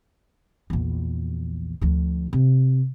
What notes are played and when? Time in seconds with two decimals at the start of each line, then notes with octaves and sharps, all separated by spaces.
0.70 A#1 E2
1.81 D2 F3
2.33 C3